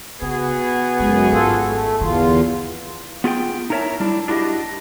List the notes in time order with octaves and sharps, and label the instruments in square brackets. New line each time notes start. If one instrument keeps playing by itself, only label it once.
[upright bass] C#3 [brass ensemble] B3 F#4 G#4
[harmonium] F#2 [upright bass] G#3
[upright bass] G#1 [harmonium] F4 A4
[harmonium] A3
[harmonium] E2 F4 [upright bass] D3 E3
[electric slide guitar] B3 F4 G#4 E5 G5
D#4 E4 A#4 C#5 E5 A5
G3 D4 E4
D4 E4 F#4 G4 D#5